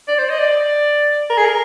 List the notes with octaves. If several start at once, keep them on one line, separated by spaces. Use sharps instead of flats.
D5
C5
D#5
D5
A#4
G#4
A#4